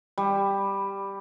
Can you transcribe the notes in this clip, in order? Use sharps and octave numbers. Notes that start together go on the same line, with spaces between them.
G3